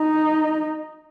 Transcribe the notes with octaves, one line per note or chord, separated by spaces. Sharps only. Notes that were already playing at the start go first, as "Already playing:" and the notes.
Already playing: D#4